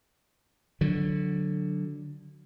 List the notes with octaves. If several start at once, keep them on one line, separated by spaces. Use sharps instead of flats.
D3 F#3